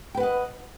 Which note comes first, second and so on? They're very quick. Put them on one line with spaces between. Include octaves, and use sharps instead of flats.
G5 B4 F#5 D#5